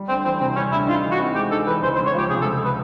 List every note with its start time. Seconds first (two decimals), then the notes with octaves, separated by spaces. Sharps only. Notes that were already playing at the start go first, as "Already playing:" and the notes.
Already playing: G3
0.08 D2 C4
0.24 E3 C4
0.40 C3 C4
0.56 G3 C#4
0.72 D2 E4
0.87 D#4 F4
1.04 E3
1.12 F#4
1.19 C4
1.35 G#3 G4
1.51 D#4 A4
1.67 E3 B4
1.82 C#2 C5
1.95 C5
1.99 C#2
2.06 C#5
2.14 F3 G4
2.30 C3 G#4
2.41 A4
2.45 C#2
2.65 B4